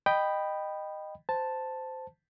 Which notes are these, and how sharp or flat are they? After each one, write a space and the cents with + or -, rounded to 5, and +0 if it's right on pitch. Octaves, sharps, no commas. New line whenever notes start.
D#5 -15 G5 +0 B5 +0
C5 -15 A5 +0